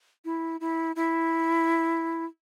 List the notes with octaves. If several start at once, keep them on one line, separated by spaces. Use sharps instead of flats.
E4
E4
E4